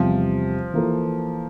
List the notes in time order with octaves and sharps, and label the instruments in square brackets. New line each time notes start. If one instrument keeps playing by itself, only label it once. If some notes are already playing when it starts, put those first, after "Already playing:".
Already playing: [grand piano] E2 C3 G3 [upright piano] F3
[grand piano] E3 A#3 F4 A4